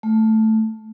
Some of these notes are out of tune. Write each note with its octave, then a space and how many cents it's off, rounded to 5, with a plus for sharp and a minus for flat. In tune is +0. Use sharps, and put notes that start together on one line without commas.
A3 +0